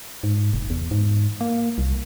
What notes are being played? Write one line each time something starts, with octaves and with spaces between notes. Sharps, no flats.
G#2
F1
E2
G#2
A#3
C2